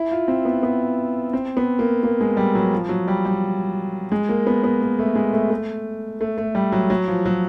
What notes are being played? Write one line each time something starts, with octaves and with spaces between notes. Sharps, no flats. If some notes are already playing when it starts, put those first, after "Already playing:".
Already playing: E4
F4
C4
B3
B3
C4
B3
A#3
A#3
G#3
G3
F#3
F3
F#3
G3
G3
G#3
A#3
B3
B3
A#3
A3
G#3
A3
A3
A3
A3
G3
F#3
F#3
F3
F#3